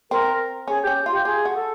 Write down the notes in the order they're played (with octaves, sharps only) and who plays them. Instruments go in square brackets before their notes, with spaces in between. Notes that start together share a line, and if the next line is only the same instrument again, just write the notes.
[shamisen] C4 [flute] A#4
[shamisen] C#4 [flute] G#4
[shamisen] C#4 [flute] G4
[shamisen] F4
[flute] G4
[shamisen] F4 [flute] G#4
[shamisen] F#4
[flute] A4